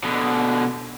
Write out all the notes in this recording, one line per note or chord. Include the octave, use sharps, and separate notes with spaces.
B2 D3